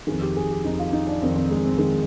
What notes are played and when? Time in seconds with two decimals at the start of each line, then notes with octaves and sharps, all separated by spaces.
0.07 D#3 G#4
0.11 F2
0.22 G4
0.37 G#4
0.51 G4
0.64 F2 D#3 D#4
0.79 F4
0.93 D#4
1.07 D4
1.22 F2 D#3 C4
1.36 C4
1.51 G#3
1.65 C4
1.79 D#3 G#3